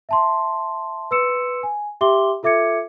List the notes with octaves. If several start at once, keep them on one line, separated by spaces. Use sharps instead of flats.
E5 A5 C6
B4 C6 E6 C#7 E7
G#5
G4 E5 G5 C6 D6 G7
F4 A4 E5 D6 G#6 C#7